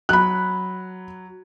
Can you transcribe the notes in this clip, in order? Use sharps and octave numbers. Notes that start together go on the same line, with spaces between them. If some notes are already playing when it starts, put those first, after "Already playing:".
F#3 B5 F#6